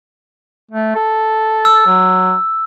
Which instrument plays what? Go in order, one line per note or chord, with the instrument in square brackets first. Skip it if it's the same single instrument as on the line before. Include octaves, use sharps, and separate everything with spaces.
[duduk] A3
A4
[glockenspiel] E6
[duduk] F#3